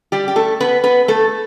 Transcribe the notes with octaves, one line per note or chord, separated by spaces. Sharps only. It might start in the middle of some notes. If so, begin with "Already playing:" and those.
G3 G4
G4
A3 A4
B3 B4
B3 B4
A3 A4